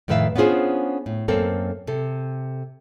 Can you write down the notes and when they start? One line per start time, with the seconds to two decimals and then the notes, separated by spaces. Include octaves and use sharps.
0.08 F2 A2 D#3 B4 E5 F5
0.36 B3 C#4 D4 F4 G#4 C5
1.06 A2
1.28 F#2 A#3 C4 A4
1.87 C3 A4